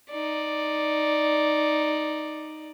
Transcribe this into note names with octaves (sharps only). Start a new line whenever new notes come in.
D#4 D5